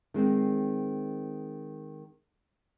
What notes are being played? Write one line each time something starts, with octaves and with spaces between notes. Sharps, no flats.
D#3 G#3 C4